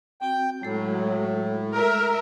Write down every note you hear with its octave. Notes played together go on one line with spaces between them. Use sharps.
C4 F#4 G5
A2 F#3 G#3 A3 A4
A#4 E5